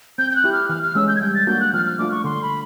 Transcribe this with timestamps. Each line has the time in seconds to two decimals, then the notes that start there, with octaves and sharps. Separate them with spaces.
0.18 C4 G6
0.31 G6
0.36 F#6
0.44 E4 G4
0.53 F6
0.69 E3 F6
0.83 F6
0.95 G#3 C#4 E6
1.08 G6
1.16 G#6
1.21 G3 G6
1.35 A6
1.47 A#3 D4 F#4 G6
1.60 F#6
1.73 F3 F6
1.86 F6
1.99 A3 D4 F4 D6
2.11 C#6
2.24 D3 C6
2.42 B5